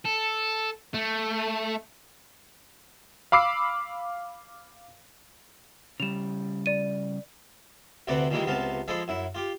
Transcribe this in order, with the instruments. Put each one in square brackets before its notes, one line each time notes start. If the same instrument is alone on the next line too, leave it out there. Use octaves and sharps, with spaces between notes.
[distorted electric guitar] A4
A3
[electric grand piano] F5 B5 D6 E6 C7
[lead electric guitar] C#3 G3 [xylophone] E7 F7
[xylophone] D5 D#7
[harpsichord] D2 C3 C4 B4 D5 F#5
A#2 D#3 E3 G3 G#3 A#3
C#2 C3 B3 F4 F5 A5
F3 G#3 G#4 A4 B5
F#2 E4
F4 G4